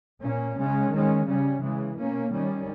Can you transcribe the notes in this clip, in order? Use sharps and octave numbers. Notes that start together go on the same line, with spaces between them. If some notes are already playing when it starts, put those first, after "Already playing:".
A#2 A#3 C#4
C#3 G#3 C#4
D#3 G#3 C#4
C#3 G3 C#4
C#3 E3 G#3
B2 A#3 C#4
D#3 G3 C#4